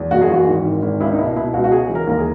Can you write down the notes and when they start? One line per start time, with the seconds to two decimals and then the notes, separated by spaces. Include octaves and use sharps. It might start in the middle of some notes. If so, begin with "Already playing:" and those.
Already playing: E2
0.11 F#1 F#4
0.22 G#4
0.29 E3 F#4
0.47 G#1
0.65 G#2
0.82 G#1
1.00 C#2 E4
1.12 D#4
1.18 B2 E4
1.36 B2 E4
1.54 C#2 F#4
1.64 F#4
1.71 C#3 G#4
1.89 E3
1.95 A#4
2.07 D#2 A#4
2.19 G#4